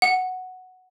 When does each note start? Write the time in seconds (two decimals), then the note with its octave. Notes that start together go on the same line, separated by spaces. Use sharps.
0.02 F#5